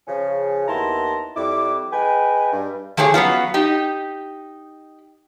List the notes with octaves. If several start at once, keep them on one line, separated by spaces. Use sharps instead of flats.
C#3 F3 C#4
D#2 B3 E4 A5 A#5 C6
F2 G3 E4 D6
G#3 B4 G5 G#5
G2
F3 A3 G4 G#4 C#5
F#3 B3 C#4 F4
D#4 G4